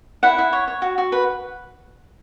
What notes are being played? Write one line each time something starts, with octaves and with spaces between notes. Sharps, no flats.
E4 F#5
E4
C#5
C#5
F#4
F#4
B4